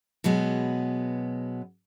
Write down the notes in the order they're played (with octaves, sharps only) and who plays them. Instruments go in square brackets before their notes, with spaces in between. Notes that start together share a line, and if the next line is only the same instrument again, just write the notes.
[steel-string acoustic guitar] B2 F#3 G#3 B3